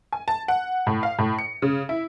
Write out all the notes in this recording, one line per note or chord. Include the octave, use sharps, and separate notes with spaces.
G#5
A5
F#5
A2
F5
A2
C#7
C#3
E4